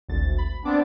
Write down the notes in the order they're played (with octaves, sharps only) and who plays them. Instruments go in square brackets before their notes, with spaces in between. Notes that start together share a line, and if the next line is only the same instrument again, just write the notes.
[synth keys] G#1 D2 A6
B5
[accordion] B3 C4 D4 [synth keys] D6